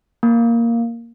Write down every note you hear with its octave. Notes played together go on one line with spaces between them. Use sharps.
A#3